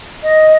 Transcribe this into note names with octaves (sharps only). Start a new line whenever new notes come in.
D#5